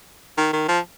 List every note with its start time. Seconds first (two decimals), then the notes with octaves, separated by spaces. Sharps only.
0.37 D#3
0.53 D#3
0.68 F3